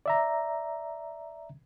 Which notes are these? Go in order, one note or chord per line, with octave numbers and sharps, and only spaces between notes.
D5 E5 A#5